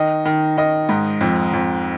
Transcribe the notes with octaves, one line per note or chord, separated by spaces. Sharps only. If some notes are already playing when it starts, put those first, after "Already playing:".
Already playing: D#3 D#5
D#3
D#3 D#5
G#2
F2
F2